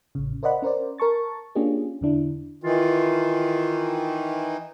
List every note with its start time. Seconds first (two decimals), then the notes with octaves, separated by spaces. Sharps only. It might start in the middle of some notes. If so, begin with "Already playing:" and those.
0.15 A1 C#3
0.43 A#4 C5 D5 D#5 F#5 B5
0.62 C#4 A#4 C5 D5
0.98 A#4 A5 C#6 A6
1.55 A#3 C#4 D4 F4 G4 G#4
2.01 E2 D3 D4 E4
2.64 D#3 E3 F4